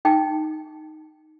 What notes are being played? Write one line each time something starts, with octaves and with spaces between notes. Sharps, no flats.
D#4 G5